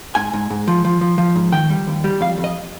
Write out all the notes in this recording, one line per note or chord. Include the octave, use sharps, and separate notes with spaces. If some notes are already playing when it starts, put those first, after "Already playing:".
G#2 G#5
G#2
G#2
F3
F3
F3
F3
G#2
D#3 G5
G3
D#2
G3
F2 F5
F2
D#5